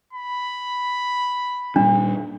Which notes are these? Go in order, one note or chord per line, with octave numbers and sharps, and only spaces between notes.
B5
A#2 G3 D4